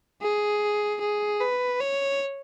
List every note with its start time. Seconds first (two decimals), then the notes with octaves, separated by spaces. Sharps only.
0.22 G#4
1.01 G#4
1.40 B4
1.80 C#5